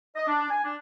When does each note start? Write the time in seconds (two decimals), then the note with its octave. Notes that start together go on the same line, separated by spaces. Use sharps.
0.16 D#5
0.27 D4
0.50 G#5
0.64 D4